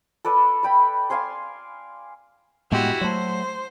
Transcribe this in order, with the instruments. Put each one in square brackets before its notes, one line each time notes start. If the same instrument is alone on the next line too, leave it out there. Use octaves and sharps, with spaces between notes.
[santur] A4 B4 D5
D5 G5 B5
D5 F5 G#5 C6
[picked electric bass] A2 G#3 B3 [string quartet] E4 F#4 G4
[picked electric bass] F#3 A3 [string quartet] C5